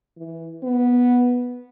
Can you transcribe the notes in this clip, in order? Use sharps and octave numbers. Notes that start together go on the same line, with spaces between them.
E3
B3